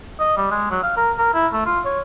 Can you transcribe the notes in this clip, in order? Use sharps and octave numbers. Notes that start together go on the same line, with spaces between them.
D#5
G3
G#3
F#3
F5
A#4
A#4
E4
A3
F4
C#5